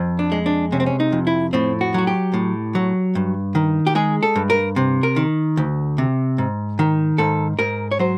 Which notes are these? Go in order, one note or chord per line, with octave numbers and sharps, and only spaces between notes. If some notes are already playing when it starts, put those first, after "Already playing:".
Already playing: F2
D4
G#3
D4
C3 C#4
C4
C#4
D#4
F2
E4
A2 C4
F#4
F#3 F#4
G4
A2
F#3
G2
D#3
G4
G#3 G#4
A4
G2
A#4
C3
A#4
D#3
D2
C3
G#2
D#3
G#2 A4
G#2 A#4
C#5
F#3 C5